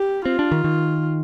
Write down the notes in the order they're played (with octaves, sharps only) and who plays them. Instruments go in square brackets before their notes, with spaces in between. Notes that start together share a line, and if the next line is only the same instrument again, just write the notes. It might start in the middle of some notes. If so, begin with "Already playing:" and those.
Already playing: [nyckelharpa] G4
[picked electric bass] C4 [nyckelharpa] F4
[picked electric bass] D4
D#3
D#3